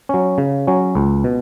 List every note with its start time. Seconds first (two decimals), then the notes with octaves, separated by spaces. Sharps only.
0.09 F#3 C#4
0.38 C#3
0.67 F#3 C#4
0.95 C#2
1.24 B2